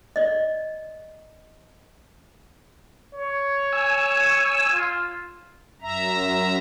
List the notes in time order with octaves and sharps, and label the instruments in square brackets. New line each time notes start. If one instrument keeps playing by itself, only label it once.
[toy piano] D5 D#5
[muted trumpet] C#5
[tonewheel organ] G#5 E6
[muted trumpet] F4
[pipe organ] F#2 E5 A#5